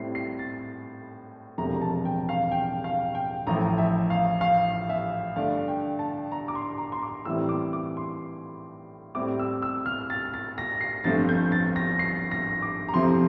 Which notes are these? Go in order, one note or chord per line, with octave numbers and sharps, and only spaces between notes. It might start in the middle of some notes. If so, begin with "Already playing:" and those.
Already playing: A2 G3 C4 E4 C7
C7
A6
E1 E2 C3 F3 A3 A#5
A5
G5
F5
G5
F5
G5
A1 A2 F3 A#5
E5
F5
F5
E5
G2 D3 A3 D4 F5
G5
A5
A#5
D6
C6
A#5
C6
D6
A2 E3 G3 C4 E4 E6
D6
D6
C6
A2 G3 C4 E4 D6
E6
E6
F6
A6
A6
A#6
C7
G1 G2 F3 A3 C4 A6
G6
A6
A#6
C7
A#6
D6
A#5
F2 C3 F3 C4 E4 C6